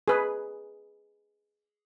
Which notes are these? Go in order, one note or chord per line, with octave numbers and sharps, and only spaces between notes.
G#4 B4